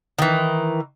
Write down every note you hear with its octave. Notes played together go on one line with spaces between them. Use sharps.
D#3 E3